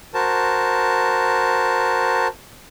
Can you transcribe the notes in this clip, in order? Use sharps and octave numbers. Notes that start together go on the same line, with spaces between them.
F#4 A#4 C5 A5